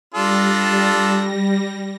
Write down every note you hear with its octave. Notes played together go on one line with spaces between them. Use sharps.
G3 D4 F4 A4 A#6